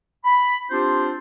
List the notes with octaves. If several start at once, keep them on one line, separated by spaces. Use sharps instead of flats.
B5
C4 D4 F4 G4 C5